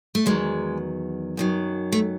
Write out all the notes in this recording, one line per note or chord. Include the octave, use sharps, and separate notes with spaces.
A3
E2 D#3 F#3 G#3
F#2 D#3 F#3
A3